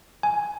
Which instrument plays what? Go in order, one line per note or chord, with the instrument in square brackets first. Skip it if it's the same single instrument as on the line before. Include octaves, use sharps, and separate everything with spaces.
[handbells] G#5